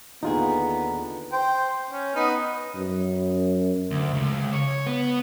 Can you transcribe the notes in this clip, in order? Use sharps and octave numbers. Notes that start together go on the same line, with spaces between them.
D#2 D3 B3 D#4 F4 G#4 A#5
C5 G5
C#4
B3 D#4 B4
F#2
D2
C#2
C#5
B3